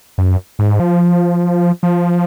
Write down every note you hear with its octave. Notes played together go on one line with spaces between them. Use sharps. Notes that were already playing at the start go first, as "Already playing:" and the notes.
F#2
G#2
F3
F3